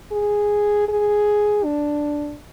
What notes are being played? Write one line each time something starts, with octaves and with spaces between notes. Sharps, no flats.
G#4
G#4
D4